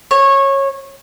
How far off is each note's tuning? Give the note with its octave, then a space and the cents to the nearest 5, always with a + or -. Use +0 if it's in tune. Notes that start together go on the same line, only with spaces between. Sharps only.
C#5 -20